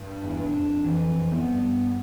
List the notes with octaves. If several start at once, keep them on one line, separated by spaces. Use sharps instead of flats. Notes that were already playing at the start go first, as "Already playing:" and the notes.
Already playing: G2
E2
D4
F2
F2 E3
F2
B3
G2